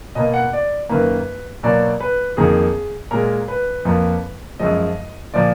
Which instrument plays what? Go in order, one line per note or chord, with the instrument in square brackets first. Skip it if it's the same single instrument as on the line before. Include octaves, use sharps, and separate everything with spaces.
[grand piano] B2 A#3 D#5
F#5
D5
F#2 D#3 A#3 B4
B2 F#3 A#3 D5
B4
F2 D#3 A#3 G#4
A#2 G#3 A#4
B4
F2 F3 A#3
F#2 F3 G#3 D#5
A#2 F3 A#3 D5